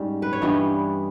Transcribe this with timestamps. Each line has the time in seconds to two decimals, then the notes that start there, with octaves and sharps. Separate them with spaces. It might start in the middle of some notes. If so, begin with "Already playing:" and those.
Already playing: G#2 G3 C#4
0.22 B4
0.33 C#5
0.42 G2 E3 G3 B3 D#5